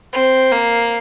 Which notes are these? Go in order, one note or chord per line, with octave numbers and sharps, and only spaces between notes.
C4
A#3